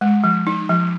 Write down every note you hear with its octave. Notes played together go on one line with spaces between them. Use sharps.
G#3
F3
D#4
F3